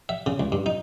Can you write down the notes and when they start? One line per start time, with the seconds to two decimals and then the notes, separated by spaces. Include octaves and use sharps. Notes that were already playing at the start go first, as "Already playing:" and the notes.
0.09 E5
0.26 C#3
0.40 C#2
0.52 G2
0.66 D#4